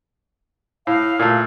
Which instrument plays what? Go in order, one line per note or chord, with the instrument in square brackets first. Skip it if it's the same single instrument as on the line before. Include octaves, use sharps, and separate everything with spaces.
[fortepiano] A2 [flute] F5
[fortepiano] A#2 A3